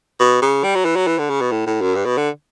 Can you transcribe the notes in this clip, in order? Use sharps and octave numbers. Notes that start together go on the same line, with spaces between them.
B2
C#3
G3
F#3
E3
F#3
E3
D3
C#3
B2
A2
A2
F#2
G2
B2
D3